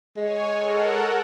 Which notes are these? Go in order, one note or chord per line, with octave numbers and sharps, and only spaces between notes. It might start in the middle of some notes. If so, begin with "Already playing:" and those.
G#3 C#5 G#5
A4 A#4 F#5